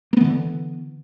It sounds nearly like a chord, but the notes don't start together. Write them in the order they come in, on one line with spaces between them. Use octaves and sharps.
A#3 B3 E3 D3